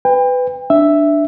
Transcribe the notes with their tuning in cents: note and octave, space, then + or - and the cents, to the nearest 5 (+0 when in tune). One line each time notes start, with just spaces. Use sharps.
B4 +20 G5 +35
D4 +10 E5 +0